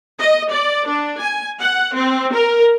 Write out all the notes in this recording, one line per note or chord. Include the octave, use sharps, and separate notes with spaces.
D#5
D5
D4
G#5
F#5
C4
A#4